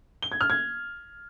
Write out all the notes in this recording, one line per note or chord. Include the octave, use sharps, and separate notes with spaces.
G7
G#6
F6
G#6